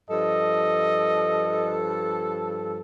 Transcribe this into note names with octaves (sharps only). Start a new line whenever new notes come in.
G2 F3 A4 D#5